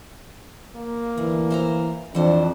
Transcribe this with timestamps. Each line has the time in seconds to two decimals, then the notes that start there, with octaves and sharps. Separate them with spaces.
0.76 A#3
1.18 D2 E3
1.50 C5 E5 A#5
2.15 F2 E3 D4 C5